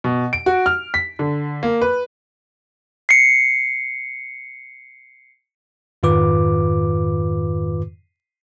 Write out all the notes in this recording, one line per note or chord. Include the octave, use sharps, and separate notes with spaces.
B2
D7
F#4
F6
B6
D3
A#3
B4
C7 C#7
F2 G#2 D#3 F4 B4 D6